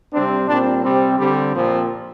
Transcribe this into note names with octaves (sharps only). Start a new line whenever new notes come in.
C3 G3 C4 D4
A#2 G3 C4 D4
C3 G3 C4
D3 G3 C4 G4
A#2 F3 C4